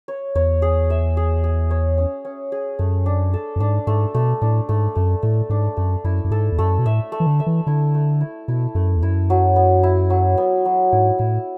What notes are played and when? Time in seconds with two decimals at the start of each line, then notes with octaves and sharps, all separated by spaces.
0.08 C#5
0.35 E2 C#5
0.62 G#4
0.90 E5
1.17 G#4
1.44 G#4
1.71 C#5
1.98 C#4
2.25 C#4
2.52 G#4
2.79 F#2 A3
3.06 D4
3.34 A4
3.56 F#2
3.60 G#2 D4
3.87 G#2 A3
4.15 B2 A3
4.42 A2 D4
4.69 G#2 A3
4.95 F#2 A3
5.23 A2 A3
5.50 G#2 D4
5.77 F#2 A3
6.04 F#2 E4
6.24 F#2
6.31 G#2 A4
6.52 E2
6.59 F#2 A3
6.79 B2
6.86 A2 E5
7.12 A3
7.20 E3
7.27 D3
7.40 E5
7.47 E3
7.67 D3 E4
7.95 A3
8.21 E4
8.48 B2 E4
8.75 F#2 A3
8.96 E2
9.03 F#2 E4
9.30 F#3
9.56 B3
9.83 E4
10.10 F#3
10.38 B3
10.65 F#3
10.92 G#2 E4
11.19 A2 E4